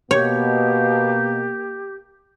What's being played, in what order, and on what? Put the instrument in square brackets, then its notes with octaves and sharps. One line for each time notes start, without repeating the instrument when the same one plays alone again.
[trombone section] B2 [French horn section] A#3 [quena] G4 [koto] C#5